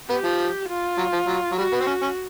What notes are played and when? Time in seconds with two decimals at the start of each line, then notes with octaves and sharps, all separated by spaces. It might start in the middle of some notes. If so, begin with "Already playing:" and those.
0.09 B3 G4
0.24 F3
0.69 F4
0.98 F#3
1.13 F3
1.27 F#3
1.52 F#3
1.58 G3 F#4
1.72 B3
1.80 C4
1.87 C#4
2.02 C#4